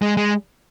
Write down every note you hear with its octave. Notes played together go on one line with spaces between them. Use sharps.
G#3
G#3